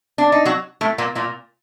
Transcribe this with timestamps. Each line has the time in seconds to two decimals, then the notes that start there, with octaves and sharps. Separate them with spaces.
0.18 D4
0.32 D#4
0.45 F#3 F#4
0.81 A2 A3
0.98 A#2 A#3
1.15 A#2 A#3